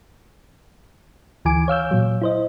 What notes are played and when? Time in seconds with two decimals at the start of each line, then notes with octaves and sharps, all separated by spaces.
1.45 D2 E3 G#5 D6 D7
1.68 C#5 F5 E6 G6
1.91 A#2 F#3
2.22 E4 C5 D#5